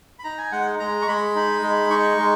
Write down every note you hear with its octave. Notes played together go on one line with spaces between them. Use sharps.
B5
D#4 A#5
G#5
G#3 F#5
G#3 A#5
C#6
G#3 B5
D#4
G#3
D#4 C#6
G#3